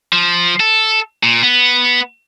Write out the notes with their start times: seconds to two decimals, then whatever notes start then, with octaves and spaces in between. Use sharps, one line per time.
0.13 F3
0.60 A4
1.23 A#2
1.43 B3